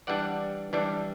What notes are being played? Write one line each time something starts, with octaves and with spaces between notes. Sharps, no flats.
E3 G3 D4 D5 F#5
E3 G3 D4